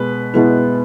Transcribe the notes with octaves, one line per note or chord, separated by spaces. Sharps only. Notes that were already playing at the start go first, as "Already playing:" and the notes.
Already playing: B2 G#3 B3 B4
B2 G#3 B3 E4